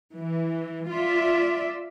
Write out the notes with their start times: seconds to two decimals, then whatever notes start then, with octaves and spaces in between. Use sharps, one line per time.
0.14 E3
0.88 F4 D5 E5